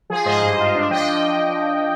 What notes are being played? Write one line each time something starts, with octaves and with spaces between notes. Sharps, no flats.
F3 G#4
G#2 C5 D#5
G2
F4
D4
F3 D#5 G5